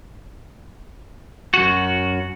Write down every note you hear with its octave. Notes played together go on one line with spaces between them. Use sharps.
F#2 F#4